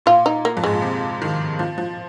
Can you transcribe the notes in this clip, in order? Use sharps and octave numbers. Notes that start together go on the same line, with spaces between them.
A#2 F4
D#4
A#3
F2
G#2 G#3
A#2
C3
D#3
F3
F3